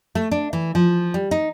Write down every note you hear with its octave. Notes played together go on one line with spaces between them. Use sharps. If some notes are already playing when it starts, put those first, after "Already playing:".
A3
D4
E3
F3
G3
D#4